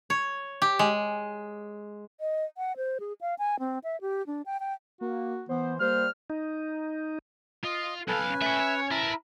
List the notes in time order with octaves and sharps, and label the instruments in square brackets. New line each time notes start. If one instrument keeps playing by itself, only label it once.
[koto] C#5
G4
G#3
[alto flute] D#5
F#5
C5
G#4
F5
G#5
C4
E5
G4
D4
G5
G5
[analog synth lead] A#3 [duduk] F#4
[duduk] E3 [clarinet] B3 [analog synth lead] C5
[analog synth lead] G3 [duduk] A#3 [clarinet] C5 [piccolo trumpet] F6
[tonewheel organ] D#4
[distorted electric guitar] F4 [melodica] D#5
[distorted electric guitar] B1 F5 [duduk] A4 [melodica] B4 G#5
[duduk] C#4
[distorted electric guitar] A3 C#5 [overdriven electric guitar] E5
[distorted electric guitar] C#5
[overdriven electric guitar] E4 [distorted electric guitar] A#4 B4 [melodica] A5